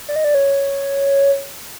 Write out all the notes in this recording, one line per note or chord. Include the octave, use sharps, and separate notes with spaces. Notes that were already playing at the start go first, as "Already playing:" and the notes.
D5
D#5
D5
C#5